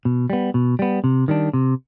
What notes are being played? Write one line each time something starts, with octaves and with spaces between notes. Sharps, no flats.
B2
G3 B3
B2
G3 B3
C3
D#3 G3 D4
C3